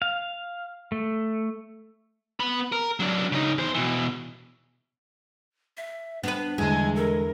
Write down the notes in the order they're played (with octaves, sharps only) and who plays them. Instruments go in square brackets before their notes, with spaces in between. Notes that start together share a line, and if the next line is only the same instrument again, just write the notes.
[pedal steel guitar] F5
A3
[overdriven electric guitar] B3 B5
A#4
F#3 D4
C#3 D#4
E2 C5
B2 E3
[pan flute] E5
[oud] B3 B4 [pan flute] D4
[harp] E2 D3 [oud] G#3 [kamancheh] G#5
[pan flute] A4 [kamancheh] A#4